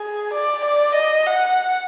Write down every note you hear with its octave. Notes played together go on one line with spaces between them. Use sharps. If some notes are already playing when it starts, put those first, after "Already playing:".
Already playing: G#4
D5
D5
D#5
F#5